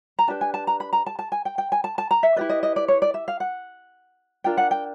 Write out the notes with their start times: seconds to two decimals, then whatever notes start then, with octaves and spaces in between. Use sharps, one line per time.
0.19 A#5
0.28 D4 G4 B4 A5
0.41 G#5
0.54 A5
0.67 A#5
0.80 B5
0.93 A#5
1.06 A5
1.19 A5
1.32 G#5
1.45 G5
1.58 G5
1.72 G#5
1.84 A5
1.98 A5
2.11 A#5
2.23 E5
2.36 E4 G4 B4 D5
2.49 D#5
2.63 D#5
2.76 D5
2.88 C#5
3.02 D5
3.14 E5
3.28 F5
3.40 F#5
4.44 D4 F4 A#4 G5
4.57 F#5
4.71 G5